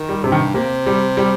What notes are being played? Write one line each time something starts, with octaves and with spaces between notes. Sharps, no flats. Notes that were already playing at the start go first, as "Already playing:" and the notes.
Already playing: D#3
G3
G2 C3
D#3
C3 A#3
G3
G3